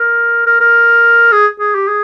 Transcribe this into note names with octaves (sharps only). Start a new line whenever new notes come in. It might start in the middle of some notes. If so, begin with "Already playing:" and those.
Already playing: A#4
A#4
A#4
G#4
G#4
G4
G#4